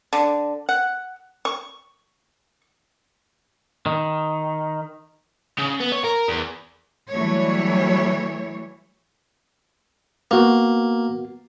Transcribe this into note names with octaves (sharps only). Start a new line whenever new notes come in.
D3
F#5
C#6
D#3
C#3
B3
C#5
A#4
E2
E3 F#3 G3 A3 C#5
A#3 B3 F#4